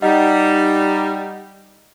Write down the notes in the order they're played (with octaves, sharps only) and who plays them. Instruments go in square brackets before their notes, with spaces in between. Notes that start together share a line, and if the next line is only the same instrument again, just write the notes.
[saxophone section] G3 [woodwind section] D#4 [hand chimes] D#5 F#5